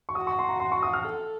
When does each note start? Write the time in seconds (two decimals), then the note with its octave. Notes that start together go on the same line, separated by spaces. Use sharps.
0.09 C#6
0.15 F#4 D#6
0.27 C#6
0.39 C6
0.49 A#5
0.60 C6
0.72 C#6
0.83 D#6
0.93 F6
1.04 A4